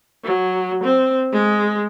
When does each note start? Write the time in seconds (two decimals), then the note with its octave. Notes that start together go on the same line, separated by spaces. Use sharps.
0.24 F#3
0.84 C4
1.33 G#3